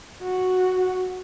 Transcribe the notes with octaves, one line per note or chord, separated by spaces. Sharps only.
F#4